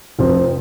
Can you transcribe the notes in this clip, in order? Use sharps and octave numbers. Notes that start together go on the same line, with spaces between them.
F1 F2 F3 C4